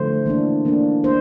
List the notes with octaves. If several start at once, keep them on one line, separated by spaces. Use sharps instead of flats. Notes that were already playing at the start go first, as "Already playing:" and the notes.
Already playing: D3 F3 A3 C5
E3 A#3 D4
E3 A#3 D4
A#3 D4 C5